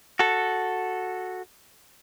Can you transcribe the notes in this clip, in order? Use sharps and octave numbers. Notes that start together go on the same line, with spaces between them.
F#4 A4